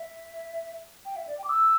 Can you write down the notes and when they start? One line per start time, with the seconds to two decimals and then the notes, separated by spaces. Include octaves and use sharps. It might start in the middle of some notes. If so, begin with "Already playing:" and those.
Already playing: E5
1.05 G5
1.16 E5
1.27 D5
1.38 G5
1.44 D6
1.49 E6